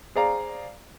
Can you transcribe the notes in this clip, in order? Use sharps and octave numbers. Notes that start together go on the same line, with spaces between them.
G#4 C5 D5 F5 A#5